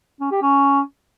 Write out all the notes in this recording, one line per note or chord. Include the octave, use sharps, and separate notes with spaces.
C#4
G4
C#4